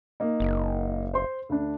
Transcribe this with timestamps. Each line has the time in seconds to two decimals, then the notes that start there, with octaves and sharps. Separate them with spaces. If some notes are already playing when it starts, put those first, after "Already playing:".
0.20 A#3 D#4
0.40 F#1
1.14 C5 C6
1.49 D2 D4